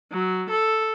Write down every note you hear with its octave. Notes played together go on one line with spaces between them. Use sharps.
F#3
A4